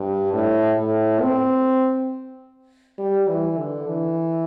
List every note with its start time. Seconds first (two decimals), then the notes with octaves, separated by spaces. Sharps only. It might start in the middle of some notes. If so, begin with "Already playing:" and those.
Already playing: G2
0.33 A2
0.78 A2
1.21 C4
2.99 G3
3.29 E3
3.58 D3
3.88 E3